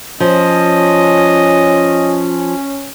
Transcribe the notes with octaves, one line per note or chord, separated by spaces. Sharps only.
F3 C#4 D#5